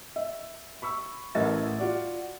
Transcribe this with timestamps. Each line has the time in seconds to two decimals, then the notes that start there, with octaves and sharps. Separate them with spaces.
0.16 E5
0.82 B5 C#6 E6
1.35 A1 A2 A#4 E5 A6
1.79 F4 F#4 D5